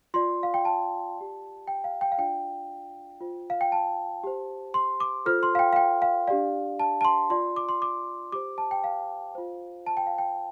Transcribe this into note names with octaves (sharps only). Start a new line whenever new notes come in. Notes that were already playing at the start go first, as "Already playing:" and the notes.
F4 D5 C6
F5
G5
A5
G4 D5
G5
F5
G5
F5
D4 F4 D5 G5
F4 C5
F5
G5
A5
G4 C5
C6
D6
F4 A4 C5 F6
C6
F5
G5
F5
G5
F5
D4 G4 D5 F5
A5
A5
C6
F4 D5 C6
D6
C6
D6
G4 C5 D6
A5
G5
F5
F4 C5
A5
G5
F5
G5